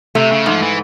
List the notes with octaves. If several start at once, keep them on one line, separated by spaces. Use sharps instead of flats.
C3 A3
C#3
G#2 F3
E3